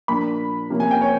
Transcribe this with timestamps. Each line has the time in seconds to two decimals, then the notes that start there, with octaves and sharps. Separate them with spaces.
0.08 A#2 F3 A#3 D4 B5
0.70 C3 F3 A#3 C#4
0.80 G#5
0.91 G5
1.01 C#5